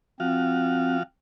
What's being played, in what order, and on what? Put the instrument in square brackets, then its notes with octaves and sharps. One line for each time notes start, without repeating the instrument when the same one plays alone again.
[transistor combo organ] F3 F#4 F5 [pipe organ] C4